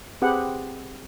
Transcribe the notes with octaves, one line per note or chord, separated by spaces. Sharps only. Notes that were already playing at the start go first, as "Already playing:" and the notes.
C4 G4 G#4 B4 F#5